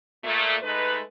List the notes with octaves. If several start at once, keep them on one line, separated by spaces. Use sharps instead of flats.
A#2 A3
G#3 A3 D#4 B4